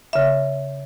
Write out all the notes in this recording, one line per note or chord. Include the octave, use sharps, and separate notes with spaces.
C#3 E5